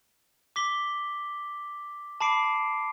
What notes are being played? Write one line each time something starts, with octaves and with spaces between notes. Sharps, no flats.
D6 B6 G7
A5 B5 D6 C7 D7